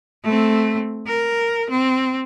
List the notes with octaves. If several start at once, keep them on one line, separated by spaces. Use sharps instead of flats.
A3 C4
A#4
C4